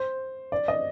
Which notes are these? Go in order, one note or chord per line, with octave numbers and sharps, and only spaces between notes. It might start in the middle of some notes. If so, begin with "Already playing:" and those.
Already playing: C5
D5
D#5